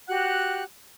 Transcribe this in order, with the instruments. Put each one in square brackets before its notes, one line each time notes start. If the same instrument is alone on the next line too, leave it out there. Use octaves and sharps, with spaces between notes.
[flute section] F#4 G4 F#5 F#6